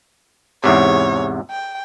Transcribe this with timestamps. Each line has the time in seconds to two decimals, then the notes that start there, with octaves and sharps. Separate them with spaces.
0.64 E2 G#2 C3 C#5
1.51 G5